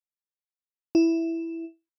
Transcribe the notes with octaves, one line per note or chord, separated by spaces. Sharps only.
E4